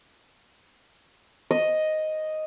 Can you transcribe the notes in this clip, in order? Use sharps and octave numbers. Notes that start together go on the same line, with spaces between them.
D#5